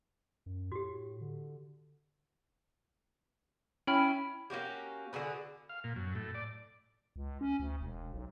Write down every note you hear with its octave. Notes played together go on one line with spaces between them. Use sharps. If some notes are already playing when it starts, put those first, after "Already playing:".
F#2
A2 F#4 G4
D3
C#4 E4 G5 B5 F6
A#3 C#4 F#4 G4
D3 F#4 G#4 B4
F5
A#2
F#2
A2
D5
C#2
C#4
D2
E1
B1